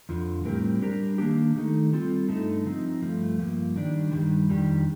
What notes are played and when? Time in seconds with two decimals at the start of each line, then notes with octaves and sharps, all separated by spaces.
0.09 F2 D3 F3
0.45 A2 G3 C4 G4 A#4
0.82 G3 D4 G4 A#4
1.18 D#3 A#3 D4 G4
1.56 D#3 A3 D#4 A4
1.93 G3 C4 F4 A4
2.29 G2 D3 A3 D#4 A4
2.66 F3 C4 D#4
3.02 G2 F3 A3
3.39 G2 F3 A#3
3.76 D#3 G3 D4
4.12 G2 D#3 G3
4.49 F2 D#3 G3 D4 G4